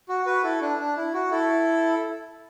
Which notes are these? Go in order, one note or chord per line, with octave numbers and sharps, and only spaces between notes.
F#4
F#4 B4
E4 A4
D4
D4
E4
F#4
E4 A4